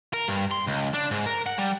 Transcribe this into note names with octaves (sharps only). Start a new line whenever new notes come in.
A#4
G2
C6
C#2
D4
G#2
A#4
F#5
G3